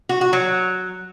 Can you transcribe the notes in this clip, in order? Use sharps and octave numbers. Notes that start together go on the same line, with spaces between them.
F#4
F#4
F#3